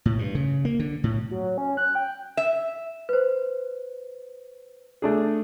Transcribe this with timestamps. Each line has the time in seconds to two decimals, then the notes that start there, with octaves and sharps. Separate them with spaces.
0.06 A2
0.19 G2
0.35 C#3
0.65 A#3
0.79 D3
1.04 A2
1.31 F#3
1.58 C#4
1.77 F#6
1.95 G5
2.37 E5
3.09 B4 C5
5.02 A3 D4 G#4